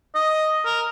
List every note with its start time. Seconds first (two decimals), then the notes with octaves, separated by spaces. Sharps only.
0.15 D#5
0.65 A#4